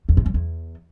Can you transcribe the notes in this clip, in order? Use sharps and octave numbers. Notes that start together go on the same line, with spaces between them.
E2
A2
F#2
E2